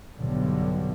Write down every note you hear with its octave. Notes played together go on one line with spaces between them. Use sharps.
B1 G2 D3